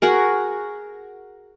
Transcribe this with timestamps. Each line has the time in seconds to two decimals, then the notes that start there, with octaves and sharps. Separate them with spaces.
0.02 F#4 G#4 A#4